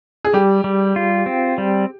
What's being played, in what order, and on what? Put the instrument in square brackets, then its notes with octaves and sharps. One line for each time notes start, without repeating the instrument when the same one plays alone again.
[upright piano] G#4
[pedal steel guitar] G3 [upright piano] G4
[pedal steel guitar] G3
F4
C4
G3